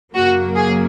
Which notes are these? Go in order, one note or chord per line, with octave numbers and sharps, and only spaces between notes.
F#2 C#3 F#3 A#3 F#4
G#4